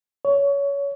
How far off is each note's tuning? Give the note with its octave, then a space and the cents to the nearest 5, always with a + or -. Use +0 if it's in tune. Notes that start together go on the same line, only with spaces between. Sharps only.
C#5 +20